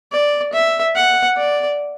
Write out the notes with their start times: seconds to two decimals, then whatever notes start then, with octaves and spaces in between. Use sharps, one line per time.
0.12 D5
0.53 E5
0.96 F#5
1.37 D5